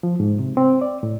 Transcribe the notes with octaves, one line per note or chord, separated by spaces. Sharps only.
F3
G#2
C3
C4
D5
A2